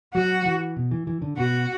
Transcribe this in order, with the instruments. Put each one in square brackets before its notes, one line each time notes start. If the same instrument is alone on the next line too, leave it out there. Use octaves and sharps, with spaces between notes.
[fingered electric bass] F#3 [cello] F#4
[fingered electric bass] E3
B2
E3
E3
D3
[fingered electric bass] B2 [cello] F#4